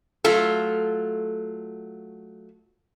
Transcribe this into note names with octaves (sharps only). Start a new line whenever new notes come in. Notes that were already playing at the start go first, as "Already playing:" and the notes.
F#3 A3 F4 A4